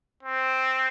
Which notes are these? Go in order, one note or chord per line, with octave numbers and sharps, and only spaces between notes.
C4